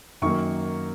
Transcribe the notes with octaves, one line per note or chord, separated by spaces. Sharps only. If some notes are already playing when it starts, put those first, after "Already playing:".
F#2 D#3 F#3 A#3 C#6